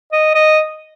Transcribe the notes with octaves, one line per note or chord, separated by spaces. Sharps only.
D#5
D#5